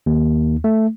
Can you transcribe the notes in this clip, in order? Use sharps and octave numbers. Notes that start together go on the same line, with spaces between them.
D#2
A3